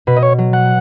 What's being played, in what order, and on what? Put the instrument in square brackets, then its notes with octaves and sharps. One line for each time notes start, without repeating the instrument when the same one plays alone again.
[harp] B2 [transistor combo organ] B4
[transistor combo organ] D#5
C#5
[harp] F#3
[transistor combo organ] F#5